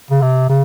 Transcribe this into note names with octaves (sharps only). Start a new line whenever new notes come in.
C#3
C3
C#3